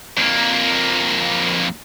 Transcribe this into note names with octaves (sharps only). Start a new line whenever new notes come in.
F2 A#3